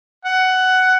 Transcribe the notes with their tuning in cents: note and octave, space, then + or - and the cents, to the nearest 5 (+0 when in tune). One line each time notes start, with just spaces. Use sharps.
F#5 +10